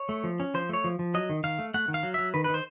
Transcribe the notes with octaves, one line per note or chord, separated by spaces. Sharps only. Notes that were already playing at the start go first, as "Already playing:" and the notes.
Already playing: C#5
A3
F3
C#4
F3 C5
A3 C#5
F3
F3
F#3 D#5
D#3
D#3 F5
A3
A3 F#5
D#3
F5
F#3
F#3 E5
D#3 B4
D#3 B4
C5